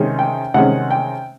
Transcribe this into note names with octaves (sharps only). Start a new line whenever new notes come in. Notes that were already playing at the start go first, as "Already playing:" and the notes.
Already playing: C3 D#3 G#3 C#4
G5
C3 D#3 G#3 C#4 F#5
G5